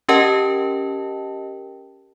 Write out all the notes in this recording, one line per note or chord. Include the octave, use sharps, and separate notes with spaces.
C#4 G4 A#4 D#5 G5 A5